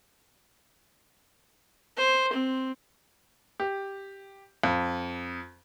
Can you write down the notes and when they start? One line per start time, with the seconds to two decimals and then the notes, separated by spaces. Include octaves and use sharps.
1.97 C5
2.33 C4
3.60 G4
4.64 F2